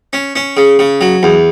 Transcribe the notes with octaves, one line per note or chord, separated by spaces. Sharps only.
C#4
C#4
C#3
C#3
F#3
E2